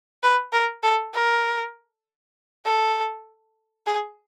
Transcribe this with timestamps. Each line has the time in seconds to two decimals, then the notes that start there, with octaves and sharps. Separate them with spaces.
0.23 B4
0.53 A#4
0.83 A4
1.13 A#4
2.65 A4
3.87 G#4